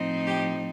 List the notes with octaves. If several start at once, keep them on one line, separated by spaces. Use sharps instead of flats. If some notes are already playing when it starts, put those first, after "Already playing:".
Already playing: A2 F3 C4 D#4
G4